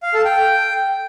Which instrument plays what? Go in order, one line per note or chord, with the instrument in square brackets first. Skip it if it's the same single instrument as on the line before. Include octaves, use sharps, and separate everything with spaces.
[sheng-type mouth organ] F5
A4
G5